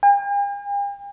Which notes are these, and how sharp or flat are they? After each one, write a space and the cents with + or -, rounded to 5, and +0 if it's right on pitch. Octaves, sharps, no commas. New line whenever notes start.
G5 +45